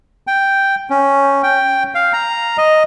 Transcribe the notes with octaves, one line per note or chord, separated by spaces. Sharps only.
G5
C#4
G5
F5
A#5
D#5